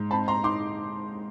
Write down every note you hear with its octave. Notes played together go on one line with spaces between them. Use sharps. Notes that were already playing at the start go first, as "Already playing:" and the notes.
Already playing: G#2
C4 A5 B5
A#5 C6
D#4 C6 D6